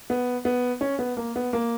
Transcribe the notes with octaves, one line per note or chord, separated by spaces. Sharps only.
B3
B3
C#4
B3
A#3
B3
A#3